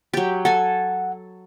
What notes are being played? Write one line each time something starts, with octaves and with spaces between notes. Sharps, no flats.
F#3 G4
A4 F#5 G#5